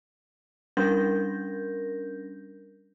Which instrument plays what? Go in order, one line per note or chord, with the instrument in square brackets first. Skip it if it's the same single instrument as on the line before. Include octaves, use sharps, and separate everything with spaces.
[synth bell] G3 C#4 D4 A#4 G6 A#6